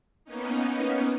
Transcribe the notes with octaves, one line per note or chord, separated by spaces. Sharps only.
A#3 B3 C#4 D#4